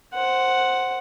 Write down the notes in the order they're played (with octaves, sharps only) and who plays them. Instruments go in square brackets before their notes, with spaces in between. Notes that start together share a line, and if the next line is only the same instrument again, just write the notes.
[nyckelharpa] C5 F#5